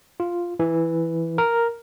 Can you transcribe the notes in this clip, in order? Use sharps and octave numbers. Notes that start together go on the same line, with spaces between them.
F4
E3
A#4